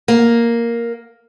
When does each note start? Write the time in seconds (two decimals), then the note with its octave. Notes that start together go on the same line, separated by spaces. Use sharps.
0.08 A#3